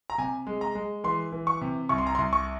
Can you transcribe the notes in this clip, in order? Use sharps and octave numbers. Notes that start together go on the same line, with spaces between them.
A#5
C3 G#5
G#3
A#5
G#3
E3 C6
E3
C#6
C3
C2 C#6
C6
A#5
C6
C2
C#6